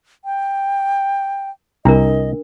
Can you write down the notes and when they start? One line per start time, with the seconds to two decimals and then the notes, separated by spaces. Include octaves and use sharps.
0.25 G5
1.85 C2 D4 A#4 D#5 A#5